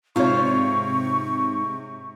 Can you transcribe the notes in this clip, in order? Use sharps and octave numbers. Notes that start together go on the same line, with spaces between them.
G#2 C3 F4 C5 C#5 C#6